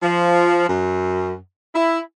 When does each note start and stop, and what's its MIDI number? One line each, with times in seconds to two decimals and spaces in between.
0.02 0.65 53
0.68 1.35 42
1.74 2.00 64